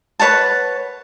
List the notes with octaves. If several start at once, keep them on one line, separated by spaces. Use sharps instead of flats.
B4 C#5 F#5 A5